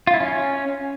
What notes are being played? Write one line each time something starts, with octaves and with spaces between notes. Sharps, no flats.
F4
E4
C#4